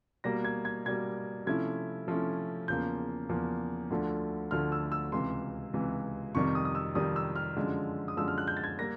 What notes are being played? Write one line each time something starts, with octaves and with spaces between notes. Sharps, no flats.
B2 G3 A#3 A#6
G#6
G#6
B2 G3 A#3 G#6
C3 F3 A3 C#4 E4 G#6
C3 F3 A3 C#4 E4
E2 C#3 F3 A#3 G6
E2 C#3 F3 A#3
D2 D3 F3 A3
D2 D3 F3 A3 F6
E6
E6
C#2 C3 E3 C6
C#2 C3 E3
F2 C3 D#3 G3 C#6
D#6
D#6
E6
F2 C3 D#3 G3 D#6
E6
F6
F#2 D3 F3 G#3
D#6
F#2 D3 F3 G#3 E6
F6
F#6
G6
A6
G#6
G3 A#3 A#6